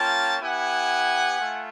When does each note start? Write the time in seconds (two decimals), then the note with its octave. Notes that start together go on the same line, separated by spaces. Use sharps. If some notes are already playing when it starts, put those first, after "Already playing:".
Already playing: A#3 C#4 F4 G5 A5
0.41 B3 E4 G4 F#5 G#5
1.41 A3 F4